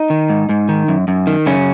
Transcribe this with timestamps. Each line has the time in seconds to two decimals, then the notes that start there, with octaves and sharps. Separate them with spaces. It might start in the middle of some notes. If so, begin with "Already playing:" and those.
Already playing: D#4
0.10 D#3
0.30 G#2
0.49 G#2
0.69 D#3
0.88 F#2
1.08 F#2
1.27 D#3
1.46 F#2 C#3 C#4